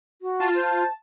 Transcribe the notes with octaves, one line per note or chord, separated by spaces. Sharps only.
F#4
F4 A5
C5